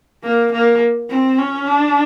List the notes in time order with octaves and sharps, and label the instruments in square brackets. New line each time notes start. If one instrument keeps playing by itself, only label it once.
[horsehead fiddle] A#3
A#3
C4
C#4
D4